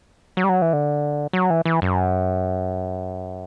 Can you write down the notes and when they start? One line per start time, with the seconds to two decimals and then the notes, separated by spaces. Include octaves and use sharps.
0.37 F#3
0.44 G3
0.49 F#3
0.62 E3
0.73 D3
1.33 F#3
1.50 E3
1.65 E3
1.82 F#2